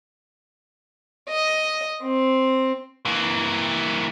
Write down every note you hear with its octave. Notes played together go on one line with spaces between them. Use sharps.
D#5
C4
E3 A#3